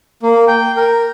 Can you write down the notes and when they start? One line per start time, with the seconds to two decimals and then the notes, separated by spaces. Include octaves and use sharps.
0.23 A#3
0.48 G5
0.77 A#4